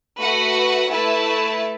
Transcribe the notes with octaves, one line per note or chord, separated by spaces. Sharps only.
A3 F#4 B4 F#5
A3 E4 B4 A5